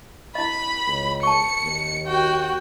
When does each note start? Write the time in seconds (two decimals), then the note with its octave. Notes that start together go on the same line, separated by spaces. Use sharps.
0.35 E4 D#5 B5
0.88 C#2
1.23 A5 C#6 C#7
1.62 D#2
2.07 F#4 G5